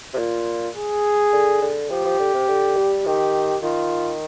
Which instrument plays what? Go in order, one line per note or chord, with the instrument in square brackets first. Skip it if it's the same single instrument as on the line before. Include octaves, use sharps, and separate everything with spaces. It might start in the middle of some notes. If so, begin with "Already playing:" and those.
[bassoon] C3
[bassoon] A#2 [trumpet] F4
[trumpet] G#4
[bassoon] D3
D3
[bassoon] F3 [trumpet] G4
[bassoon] F3
D3
C3
D3
G3
[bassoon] D#3 [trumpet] G4
[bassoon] D#3 [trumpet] F4